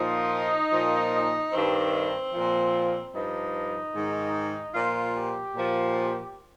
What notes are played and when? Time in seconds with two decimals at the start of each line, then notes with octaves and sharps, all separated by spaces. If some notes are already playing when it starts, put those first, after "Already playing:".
Already playing: A#2 F3 D#4
0.72 A#2 F3
1.52 G2 D#3 C4
2.32 A#2 F3
3.14 G2 F3 D#4
3.94 G#2 D#3
4.74 A#2 F3 F4
5.14 G4
5.54 A#2 F3